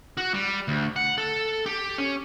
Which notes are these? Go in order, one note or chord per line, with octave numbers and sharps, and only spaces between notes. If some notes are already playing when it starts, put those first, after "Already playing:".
F#4
G3
D2
F#5
A4
G4
C#4